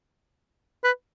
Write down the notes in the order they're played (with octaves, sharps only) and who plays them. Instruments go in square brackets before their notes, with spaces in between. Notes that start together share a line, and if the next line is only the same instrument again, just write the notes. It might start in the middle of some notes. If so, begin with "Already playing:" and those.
[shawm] B4